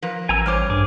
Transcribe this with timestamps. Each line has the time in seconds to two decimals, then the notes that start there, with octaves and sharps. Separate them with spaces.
0.02 F3 A#4 B4
0.29 A1 G#5 A#5 E6
0.46 G3 C5 C#5 D6 F6
0.70 G2 G#4 D6